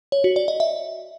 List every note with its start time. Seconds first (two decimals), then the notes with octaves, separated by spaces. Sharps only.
0.12 C#5
0.24 F#4
0.36 D5
0.48 D#5
0.60 E5